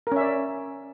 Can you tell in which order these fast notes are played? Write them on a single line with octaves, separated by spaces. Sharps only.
A#4 C#4 E5 D5